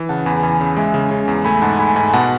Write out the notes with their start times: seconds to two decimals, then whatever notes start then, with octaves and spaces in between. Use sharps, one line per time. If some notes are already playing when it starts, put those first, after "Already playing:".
Already playing: E3
0.09 C#3 F#5 A5
0.26 E2 G#5 B5
0.43 E2 G#5 B5
0.61 C#3
0.77 G#3 E5 G#5
0.94 C#3
1.11 C#3
1.28 E2
1.45 A3 G#5 B5
1.62 G#2 F#5 A5
1.79 A3 G#5 B5
1.96 G#2 G#5 B5
2.13 B2 F#5 A5